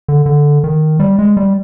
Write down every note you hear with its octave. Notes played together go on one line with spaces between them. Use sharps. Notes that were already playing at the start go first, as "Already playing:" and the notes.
D3
D3
D#3
G3
G#3
G3